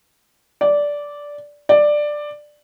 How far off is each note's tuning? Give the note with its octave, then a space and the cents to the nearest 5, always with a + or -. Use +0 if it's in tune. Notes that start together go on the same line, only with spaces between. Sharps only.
D5 -10
D5 +10